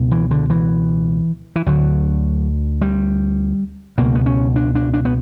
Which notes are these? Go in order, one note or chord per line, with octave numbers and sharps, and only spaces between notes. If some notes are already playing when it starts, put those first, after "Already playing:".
Already playing: C#2 B2
E3
D3
E3
E3
D2 D3 F#3
G3
C#2 B2 A#3
B3
C#4
D4
D4
D4
B3